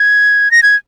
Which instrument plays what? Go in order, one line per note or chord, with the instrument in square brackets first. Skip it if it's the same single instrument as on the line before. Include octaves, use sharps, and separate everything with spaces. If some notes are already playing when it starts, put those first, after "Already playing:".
Already playing: [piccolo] G#6
A#6
G#6